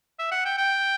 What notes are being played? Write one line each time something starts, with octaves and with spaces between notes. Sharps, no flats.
E5
F#5
G5
G5